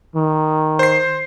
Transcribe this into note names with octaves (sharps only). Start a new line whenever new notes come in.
D#3
C5 C7